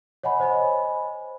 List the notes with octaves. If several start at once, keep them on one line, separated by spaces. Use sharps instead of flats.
C#5 D#5 F#5 G#5 B5
C5 D#5 G#5 B5